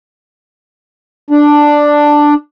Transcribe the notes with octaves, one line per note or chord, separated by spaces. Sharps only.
D4